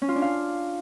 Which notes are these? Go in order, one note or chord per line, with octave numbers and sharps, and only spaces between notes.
C#4
F4
D4
F5